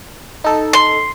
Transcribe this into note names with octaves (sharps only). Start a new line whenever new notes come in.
D#4 A4
C6